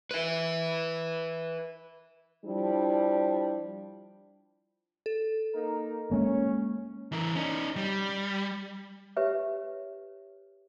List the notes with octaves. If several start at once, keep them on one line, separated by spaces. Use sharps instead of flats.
B4 E5
F3 G3 D4 E4
A4
A#3 D#4 A#4
G#3 A#3 C#4
E3 A#4
C#4 D#4
G3
G4 B4 C#5 E5